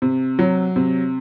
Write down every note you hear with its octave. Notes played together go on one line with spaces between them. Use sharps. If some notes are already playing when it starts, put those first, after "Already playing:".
C3
F#3
C3